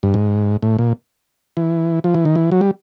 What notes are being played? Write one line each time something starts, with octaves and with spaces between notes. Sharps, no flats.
G2
G#2
A2
A#2
E3
F3
E3
D#3
E3
F#3
G3